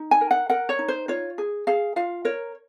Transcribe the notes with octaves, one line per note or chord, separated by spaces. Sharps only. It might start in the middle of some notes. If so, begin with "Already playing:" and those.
Already playing: D#4
G#5
A#4
F#5
A#4 F#5
C#5
D#4
C5
F4 C#5
G#4
G#4 F5
F4 F5
A#4 C#5